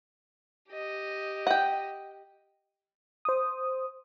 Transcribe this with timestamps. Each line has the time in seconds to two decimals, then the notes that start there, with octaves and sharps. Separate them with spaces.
0.70 G4 D#5
1.47 F#5 G5
3.25 C5 D#6